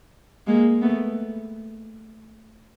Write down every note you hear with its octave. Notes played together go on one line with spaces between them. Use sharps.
G#3 A#3
A3 B3